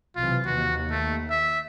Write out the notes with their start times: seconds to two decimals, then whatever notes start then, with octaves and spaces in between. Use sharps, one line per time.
0.16 B1 C3 E3 F4
0.46 D#2 F#4
0.91 A3
1.30 E5